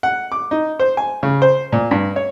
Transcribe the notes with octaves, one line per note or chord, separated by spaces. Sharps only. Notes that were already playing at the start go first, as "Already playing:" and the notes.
F#5
D6
D#4
C5
G#5
C#3
C5
A#2
G2
C#5